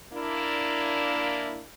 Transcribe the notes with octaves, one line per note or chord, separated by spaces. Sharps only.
A#3 D4 E4